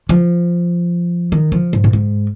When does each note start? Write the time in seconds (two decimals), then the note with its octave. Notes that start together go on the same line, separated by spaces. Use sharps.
0.09 F3
1.32 D#3
1.52 F3
1.73 G#2
1.84 A#2
1.93 G#2